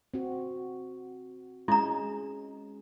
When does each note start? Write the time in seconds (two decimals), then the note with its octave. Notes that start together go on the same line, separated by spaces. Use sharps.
0.14 C4 F#4
1.68 G#3 C#4 E4 A#5